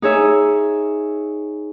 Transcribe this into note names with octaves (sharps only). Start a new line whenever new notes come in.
D#4 G#4 C#5 E5